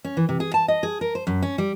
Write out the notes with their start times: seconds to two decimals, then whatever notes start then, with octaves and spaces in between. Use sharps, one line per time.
0.05 C#4
0.17 E3
0.29 C3
0.40 G#4
0.54 A5
0.68 D#5
0.83 G#4
1.01 A#4
1.15 C5
1.27 F#2
1.43 C#4
1.58 G3